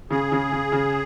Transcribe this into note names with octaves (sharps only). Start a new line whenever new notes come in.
C#3 G#4
C#3
C#3
C#3